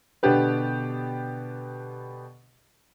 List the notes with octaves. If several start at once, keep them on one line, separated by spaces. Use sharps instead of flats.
B2 D3 B3 D4 G4 B4